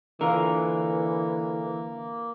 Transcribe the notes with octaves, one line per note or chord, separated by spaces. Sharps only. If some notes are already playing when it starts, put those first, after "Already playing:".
D3 E3 A#3 F4 A#4